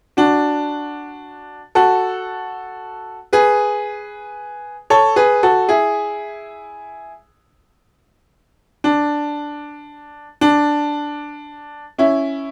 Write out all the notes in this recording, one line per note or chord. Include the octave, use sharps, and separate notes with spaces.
D4 F#4
F#4 A4
G#4 B4
A4 C#5
G#4 B4
F#4 A4
E4 G#4
D4
D4
C#4 E4